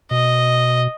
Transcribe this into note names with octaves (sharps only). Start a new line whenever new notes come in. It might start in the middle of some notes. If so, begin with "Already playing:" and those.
B2 D#5